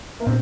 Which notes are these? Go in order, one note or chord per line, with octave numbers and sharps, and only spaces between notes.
A#3
A#2 C4